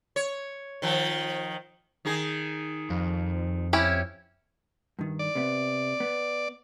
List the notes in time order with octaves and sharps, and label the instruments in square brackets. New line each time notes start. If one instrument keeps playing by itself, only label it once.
[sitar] C#5
D#3 F3
D#3 D#4 G#4
[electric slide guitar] F2
[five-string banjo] C#4 E4 G4
[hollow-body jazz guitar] G2 D#3
[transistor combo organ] D5
[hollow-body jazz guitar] C3 B3
B3